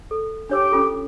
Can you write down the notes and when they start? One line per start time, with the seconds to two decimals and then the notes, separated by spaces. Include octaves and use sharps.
0.11 A4
0.49 D4 G4 C#5 E6
0.72 C#4 F4 A4